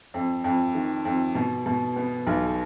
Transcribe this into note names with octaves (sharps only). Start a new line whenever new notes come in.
F2
F2
D#3
F2
B2
B2
B3
B1